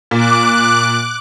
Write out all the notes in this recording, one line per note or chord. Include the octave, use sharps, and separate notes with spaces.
A#2 D6 F#6